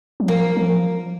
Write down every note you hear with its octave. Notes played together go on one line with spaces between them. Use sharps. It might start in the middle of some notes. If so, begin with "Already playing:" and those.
F#3
F3 A#3
F3